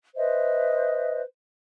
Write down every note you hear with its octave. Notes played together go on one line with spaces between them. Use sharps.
B4 C5 D#5 E5